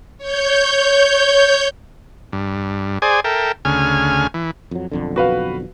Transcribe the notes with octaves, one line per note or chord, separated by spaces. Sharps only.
C#5 G6
G2
G#4 C5 D5 G#5
A4 A#4 E5 G5
D2 C#3 G#5 F6
E3
F2 F#3
B1 F2 D3
F#4 B4 F5